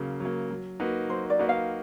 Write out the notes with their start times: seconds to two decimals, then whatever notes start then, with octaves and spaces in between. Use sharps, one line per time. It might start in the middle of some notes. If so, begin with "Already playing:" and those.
Already playing: C#3 F#3 A#3
0.20 F#3 A#3
0.51 F#3
0.80 A#3 D#4 F#4 B4
1.10 F#3 C5
1.30 D5
1.39 A#3 D#4 F#4 B4
1.49 F5